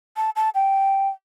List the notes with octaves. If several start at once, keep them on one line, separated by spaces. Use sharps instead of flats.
A5
A5
G5